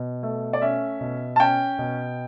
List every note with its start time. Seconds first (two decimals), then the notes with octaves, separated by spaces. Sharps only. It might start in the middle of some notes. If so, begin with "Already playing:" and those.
Already playing: B2
0.23 A3
0.53 D5
0.61 C#4 E5
1.01 B2
1.36 A5
1.40 C#4 G5
1.79 B2